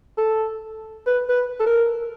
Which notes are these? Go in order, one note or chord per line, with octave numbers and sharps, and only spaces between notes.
A4
B4
B4
A4
A#4